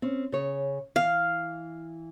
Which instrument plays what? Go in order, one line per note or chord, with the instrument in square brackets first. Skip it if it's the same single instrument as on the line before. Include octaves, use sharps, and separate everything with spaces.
[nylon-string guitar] C4 C#4
C#3 C#5
[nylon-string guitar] E3 [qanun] F5